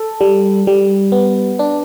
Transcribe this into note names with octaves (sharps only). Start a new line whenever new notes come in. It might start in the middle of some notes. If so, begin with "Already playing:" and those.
Already playing: A4
G3
G3
B3
D4